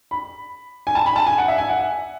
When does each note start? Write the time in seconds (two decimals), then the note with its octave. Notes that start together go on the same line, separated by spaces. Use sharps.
0.11 B5
0.87 G#5
0.95 A5
1.06 B5
1.16 A5
1.27 G#5
1.38 F#5
1.48 E5
1.58 G#5
1.69 F#5
1.79 E5